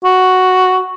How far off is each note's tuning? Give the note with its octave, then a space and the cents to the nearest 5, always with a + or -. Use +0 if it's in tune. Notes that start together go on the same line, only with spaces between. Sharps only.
F#4 +0